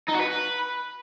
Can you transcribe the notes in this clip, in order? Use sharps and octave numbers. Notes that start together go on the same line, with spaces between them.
D#4
F#4
B4